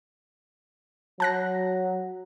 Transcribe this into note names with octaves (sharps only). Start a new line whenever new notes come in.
F#3 A5 F#6 A#6